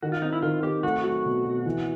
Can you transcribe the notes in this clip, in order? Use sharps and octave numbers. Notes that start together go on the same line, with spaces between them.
D#3 F#4
F4
C4 D#4
E4
D#3 F4
C4 G4
A3 F#4
F#3 F#4
B2
B2
E3